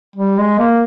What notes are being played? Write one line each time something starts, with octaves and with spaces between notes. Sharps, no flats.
G3
G#3
A#3